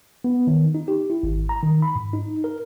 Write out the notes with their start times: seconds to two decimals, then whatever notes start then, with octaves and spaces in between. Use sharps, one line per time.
0.24 B3
0.47 D#3
0.75 D#4
0.88 G4
1.10 E4
1.23 G#1
1.49 A#5
1.63 D#3
1.82 B5
1.96 G#2
2.13 D#4
2.44 A#4